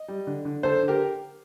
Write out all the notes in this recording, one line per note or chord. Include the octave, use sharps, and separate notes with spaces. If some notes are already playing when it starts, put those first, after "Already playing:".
Already playing: D#5
G3
D3
D3
D3 A4 C5
D3
G4 A#4